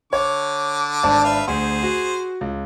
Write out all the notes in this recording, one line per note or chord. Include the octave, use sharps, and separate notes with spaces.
D3 C#5 D6
G#1 D4 A5
B4 E5 F5
D2 G#4 C5
F#4
C#2